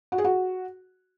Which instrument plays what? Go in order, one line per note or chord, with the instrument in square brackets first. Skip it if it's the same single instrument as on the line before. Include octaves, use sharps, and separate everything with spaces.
[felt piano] F#4
G#4
F#4